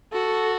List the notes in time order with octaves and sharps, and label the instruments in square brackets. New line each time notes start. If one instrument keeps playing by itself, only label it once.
[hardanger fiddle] F#4 [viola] A4